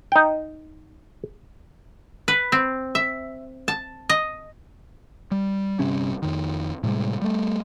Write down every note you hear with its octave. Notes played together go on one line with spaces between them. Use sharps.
D#4 G5
B4
C4
E5
A5
D#5
G3
G1 C3 G3 C#4
F2 D#3
A2 C3 G3 G#3
G3 A3